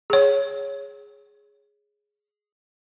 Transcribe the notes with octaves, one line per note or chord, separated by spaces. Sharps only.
G#4 C#5